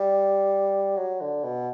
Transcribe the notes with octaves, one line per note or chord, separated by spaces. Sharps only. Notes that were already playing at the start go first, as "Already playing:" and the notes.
Already playing: G3
F#3
D3
B2